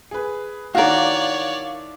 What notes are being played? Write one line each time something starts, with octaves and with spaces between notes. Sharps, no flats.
G#4 B4
D#3 D4 E4 F#4 A#4 C#5 D5 F5